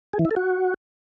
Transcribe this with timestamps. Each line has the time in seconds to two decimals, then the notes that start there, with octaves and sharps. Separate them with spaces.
0.13 G#4
0.19 E3
0.25 E4
0.31 A4
0.36 F#4